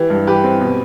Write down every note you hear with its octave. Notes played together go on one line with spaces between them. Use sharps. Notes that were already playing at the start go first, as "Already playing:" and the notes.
Already playing: E3 G4
G2
E3 G4 B4
C4
B2